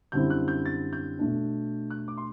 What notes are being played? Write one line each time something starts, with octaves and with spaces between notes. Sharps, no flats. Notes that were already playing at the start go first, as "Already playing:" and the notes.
F#2 D3 G3 C4 E4 G6
F#6
G6
A6
G6
B2 A3 D4
F#6
D6
C6